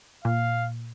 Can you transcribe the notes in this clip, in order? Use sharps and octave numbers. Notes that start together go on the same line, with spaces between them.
A#2 F5